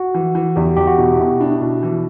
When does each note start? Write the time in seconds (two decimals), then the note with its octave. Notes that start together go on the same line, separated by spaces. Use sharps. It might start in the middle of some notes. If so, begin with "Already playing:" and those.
Already playing: F#4
0.14 E3
0.35 E3
0.56 E2 G4
0.67 F#4
0.77 E2 G4
0.87 F#4
0.98 B2 E4
1.19 B2
1.40 D4 E4
1.61 B2
1.83 E3